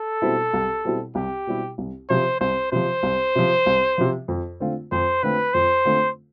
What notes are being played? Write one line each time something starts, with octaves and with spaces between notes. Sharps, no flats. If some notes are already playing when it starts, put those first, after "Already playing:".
Already playing: A4
B2 G3 C4 E4
C2
B2 G3 C4 E4
C2 G4
B2 G3 C4 E4
C2
C3 F3 C5
C2 C5
C3 F3 C5
C2
C3 F3
C2
C3 F3
F2
D3 A3 C4 F4
F2 C5
D3 A3 C4 F4 B4
F2 C5
D3 A3 C4 F4